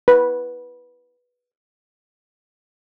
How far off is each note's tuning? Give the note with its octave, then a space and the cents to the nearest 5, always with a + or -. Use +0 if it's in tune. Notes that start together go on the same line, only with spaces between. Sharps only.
B4 -10